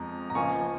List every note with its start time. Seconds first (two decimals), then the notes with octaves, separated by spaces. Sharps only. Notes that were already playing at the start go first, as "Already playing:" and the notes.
Already playing: F2 F3 G#3 A#5
0.30 A#5
0.35 C#2 C#3 F3 A#3 G#5 C#6